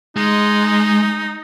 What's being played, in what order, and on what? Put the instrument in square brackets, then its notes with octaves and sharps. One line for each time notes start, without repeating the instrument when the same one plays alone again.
[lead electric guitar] G#3 [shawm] D#4